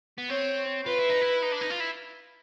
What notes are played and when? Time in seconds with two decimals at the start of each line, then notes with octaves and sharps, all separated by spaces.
0.18 B3
0.30 C4 C#5
0.86 F4 B4
0.99 E4
1.10 D#4
1.21 E4
1.42 D#4
1.52 D4
1.61 D#4
1.70 F4
1.80 E4